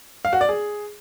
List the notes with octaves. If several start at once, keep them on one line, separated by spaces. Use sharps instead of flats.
F5
F#4
D5
G#4